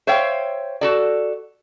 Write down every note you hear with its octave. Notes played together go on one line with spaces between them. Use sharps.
C5 C#5 E5 F5 G5
F#4 A4 D5